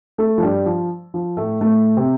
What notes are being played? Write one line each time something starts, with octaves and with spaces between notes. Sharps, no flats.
A3 A4
F3
G2 G3
F3
F3
A2 A3
A2 A3
C3 C4